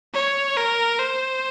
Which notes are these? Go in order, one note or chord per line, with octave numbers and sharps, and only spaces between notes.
C#5
A#4
C5